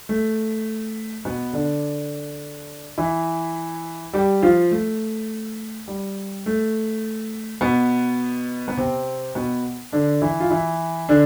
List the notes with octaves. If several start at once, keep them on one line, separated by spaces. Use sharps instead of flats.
A3
B2 B3
D3 D4
E3 E4
G3 G4
F3 F4
A3
G3
A3
B2 B3
B3
C3 C4
B2 B3
D3 D4
E3 E4
F4
E3 E4
D3 D4